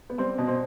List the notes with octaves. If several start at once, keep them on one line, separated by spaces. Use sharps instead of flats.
B3
G3 C4
B2
C4